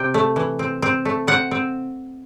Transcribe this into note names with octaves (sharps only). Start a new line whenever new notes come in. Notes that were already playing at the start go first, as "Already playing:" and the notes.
Already playing: C3 G5
A3
E3
C4
C4
A3
C4 F#5
C4